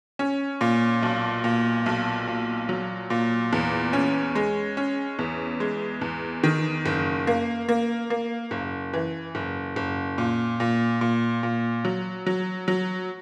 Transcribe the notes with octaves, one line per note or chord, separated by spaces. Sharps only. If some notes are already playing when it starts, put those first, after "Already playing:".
C#4
A#2
B1
A#2
B1
A#2
F#3
A#2
E2
C#4
G#3
C#4
E2
G#3
E2
D#3
F#1
A#3
A#3
A#3
F#1
E3
F#1
F#1
A#2
A#2
A#2
A#2
F#3
F#3
F#3